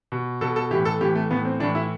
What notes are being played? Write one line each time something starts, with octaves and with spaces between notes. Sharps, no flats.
B2
B2 A4
A4
A2 E3 G4
A4
A2 E3 G4
A3
A2 E3 B3
C4
A2 E3 D4
E4